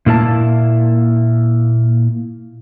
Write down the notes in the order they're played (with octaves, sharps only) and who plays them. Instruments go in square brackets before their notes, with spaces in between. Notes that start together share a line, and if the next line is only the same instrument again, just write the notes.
[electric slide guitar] A#2 A#3 E4 A#4 A5